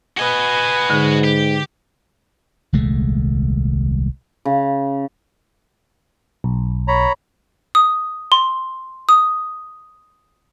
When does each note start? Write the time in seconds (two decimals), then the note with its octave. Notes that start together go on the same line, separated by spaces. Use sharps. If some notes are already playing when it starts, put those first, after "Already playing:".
0.17 F#4 B4 D#5 G#5
0.90 G#2 D3
1.24 G4
2.73 D#1 C2 G#3 A3
4.45 C#3
6.44 B1
6.88 C#5 A#5 B5
7.75 D#6
8.32 C6
9.09 D#6